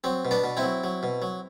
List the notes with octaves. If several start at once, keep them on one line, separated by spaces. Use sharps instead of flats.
F#3 C4
B2
B3 D4
B2
C4 E4
F#3
F#3
B2
F#3